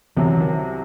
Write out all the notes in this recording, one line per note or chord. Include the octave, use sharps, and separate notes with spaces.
C2 C3 E3 F#3
D#3